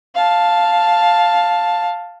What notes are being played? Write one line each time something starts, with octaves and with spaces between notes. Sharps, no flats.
F5 A5